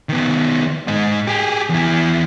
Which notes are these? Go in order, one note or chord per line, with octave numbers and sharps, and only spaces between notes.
D#3 B3
G#2 D#5
G4 G#4
E2 E4